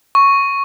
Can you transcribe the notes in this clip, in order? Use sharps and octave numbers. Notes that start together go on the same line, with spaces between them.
C#6